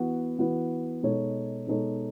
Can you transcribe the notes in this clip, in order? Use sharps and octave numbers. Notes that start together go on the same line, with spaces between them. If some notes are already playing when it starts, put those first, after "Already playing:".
Already playing: E3 B3 F#4 B4
E3 B3 F#4 B4
B2 G#3 D#4 A4 C#5
B2 G#3 D#4 A4 C#5